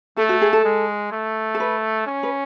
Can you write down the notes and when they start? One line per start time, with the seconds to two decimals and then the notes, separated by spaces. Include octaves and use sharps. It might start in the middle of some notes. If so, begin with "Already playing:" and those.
0.17 A3 A4
0.29 F#4
0.42 G#4
0.53 A4
0.65 G#3
1.12 A3
1.55 A4
1.60 B4
2.07 C#4
2.23 B4